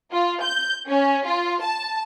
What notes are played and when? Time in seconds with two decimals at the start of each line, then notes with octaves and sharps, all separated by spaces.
0.11 F4
0.42 G6
0.88 C#4
1.25 F4
1.61 A5